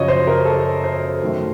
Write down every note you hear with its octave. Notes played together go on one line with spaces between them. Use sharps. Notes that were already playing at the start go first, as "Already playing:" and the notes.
Already playing: F#2 C#3 F3 C#5 D#5
C5
A#4
A4
C5
F#2 D#3 A3